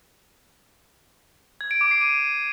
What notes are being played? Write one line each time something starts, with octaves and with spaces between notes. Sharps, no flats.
G#6
D7
D6
C7
D#7